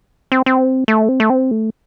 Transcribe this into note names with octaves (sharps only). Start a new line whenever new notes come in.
C4
C4
A3
C4
A3
C4
A3